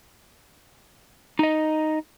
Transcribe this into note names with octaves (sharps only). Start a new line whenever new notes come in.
D#4 D#5